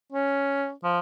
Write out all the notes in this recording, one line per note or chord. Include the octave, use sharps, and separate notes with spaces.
C#4
F3